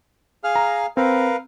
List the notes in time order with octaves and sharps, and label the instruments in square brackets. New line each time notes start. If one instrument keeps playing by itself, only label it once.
[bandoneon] G#4 F5 F6
[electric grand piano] A#5
[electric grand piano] C4 [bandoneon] A#4 B4 F5